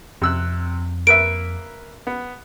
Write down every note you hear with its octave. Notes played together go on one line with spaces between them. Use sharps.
F2 C3 E6 F#6
A#3 B4 E5 D7
B3